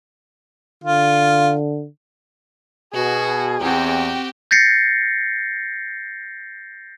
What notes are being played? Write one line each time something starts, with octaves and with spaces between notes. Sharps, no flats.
D3 F4
B2 F#4 G#4
E2 C4 F#4 G4 G5
G6 A6 A#6 C7 C#7